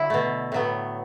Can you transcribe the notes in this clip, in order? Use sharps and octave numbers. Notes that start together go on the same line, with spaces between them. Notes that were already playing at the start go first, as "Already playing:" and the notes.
Already playing: D3 F#3 E4
B2 A3
A2 F#3 B3